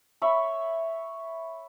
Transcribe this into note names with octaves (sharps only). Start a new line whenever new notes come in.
C#5 E5 B5 C#6